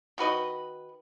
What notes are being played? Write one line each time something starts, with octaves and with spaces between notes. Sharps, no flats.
D#3 F#4 B4 D#5